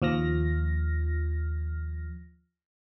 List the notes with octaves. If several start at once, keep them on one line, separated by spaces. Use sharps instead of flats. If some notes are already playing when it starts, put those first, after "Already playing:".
D#2 F3 F6 A#6